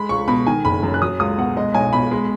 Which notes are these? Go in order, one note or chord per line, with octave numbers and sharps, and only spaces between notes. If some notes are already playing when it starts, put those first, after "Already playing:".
Already playing: G#3 B5
C#2 C#6
B2 B5
D#3 G#5
F#1 B5
F#2
F#6
F#3 D#6
C#2 D#6
B2 F#5
G#3 D#5
B1 G#5
B2 B5
G#3